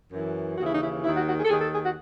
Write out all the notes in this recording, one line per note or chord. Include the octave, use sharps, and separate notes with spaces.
F#2 E3
D#2 C#3 E3 F#4
E4
D#4
E4
D#2 D#3 E4
F#4
F#4
G#4
A4
D#2 D#3 G#4
A4
G#4
F#4